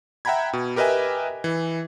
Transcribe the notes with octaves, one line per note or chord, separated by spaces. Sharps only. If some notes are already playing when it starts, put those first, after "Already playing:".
E5 F#5 G5 A#5 B5 G#6
B2
G4 A#4 B4 D#5 E5 G#5
E3